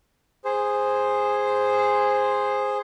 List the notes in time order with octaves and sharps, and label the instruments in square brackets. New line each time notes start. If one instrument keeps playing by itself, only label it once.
[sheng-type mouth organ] G#4 C5